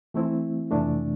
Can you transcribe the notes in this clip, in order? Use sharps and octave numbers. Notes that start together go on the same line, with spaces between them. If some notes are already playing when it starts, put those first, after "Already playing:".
E3 A3 C4 E4
F2 C3 E3 A3 D4